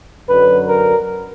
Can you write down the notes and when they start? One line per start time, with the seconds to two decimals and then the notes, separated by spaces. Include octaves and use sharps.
0.29 F#2 D3 F#3 B4
0.69 A#4